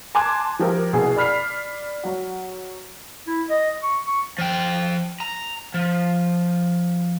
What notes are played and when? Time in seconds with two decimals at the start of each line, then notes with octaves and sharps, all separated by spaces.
0.15 G#5 A5 C6 D6 F#6 G#6
0.59 F3 G4 A#4
0.93 C2 B2 A#3 G#4 F#5
1.16 D5 B5 F6 B6 C7
2.04 F#3 F#4
3.27 E4
3.50 D#5
3.83 C#6
4.07 C#6
4.38 F3 G5
5.20 A#5
5.74 F3